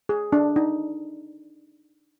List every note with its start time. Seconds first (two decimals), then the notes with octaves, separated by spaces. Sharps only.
0.09 G#4
0.33 D4
0.56 D#4